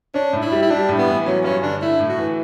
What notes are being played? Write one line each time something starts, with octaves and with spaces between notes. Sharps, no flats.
C#4 D4
A2
E4
G3
E4
G3 D4
A2
B3
E3
F#3 C#4
G2 C#4
D3 D4
A3 E4
A2
F#4
E3